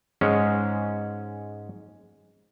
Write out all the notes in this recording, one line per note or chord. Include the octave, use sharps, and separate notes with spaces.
G#2 G#3 C#4